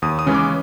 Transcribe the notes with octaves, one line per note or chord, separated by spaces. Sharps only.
D#2 D#6
D#6
C#3 E3 G#3 C#4
D6